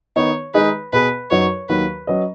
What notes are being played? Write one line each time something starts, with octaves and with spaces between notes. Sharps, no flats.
D#3 B3 D#4 C#5
D#3 G#3 D#4 G#4 B4
B2 B3 G#4 B4
F#2 F#3 D#4 F#4 B4 C#5
D#2 D#3 F#3 B4
F#3 C#4 B4 D#5